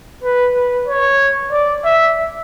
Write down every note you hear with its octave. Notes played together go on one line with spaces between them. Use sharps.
B4
B4
C#5
D5
E5